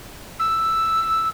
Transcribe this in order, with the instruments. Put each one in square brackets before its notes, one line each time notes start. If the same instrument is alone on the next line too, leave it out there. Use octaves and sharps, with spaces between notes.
[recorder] E6